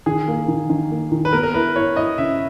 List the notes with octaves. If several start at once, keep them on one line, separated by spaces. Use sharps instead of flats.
D#3 G#4
A#3
D#3
D#3
A#3
D#3
B4
B3 A#4
A#4
E4 B4
E4 C#5
E4 D#5
C#3 E5